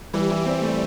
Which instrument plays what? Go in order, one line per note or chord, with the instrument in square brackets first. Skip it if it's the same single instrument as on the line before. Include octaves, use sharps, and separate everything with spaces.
[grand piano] E3 [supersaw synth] G3
[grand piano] E3
C4
A3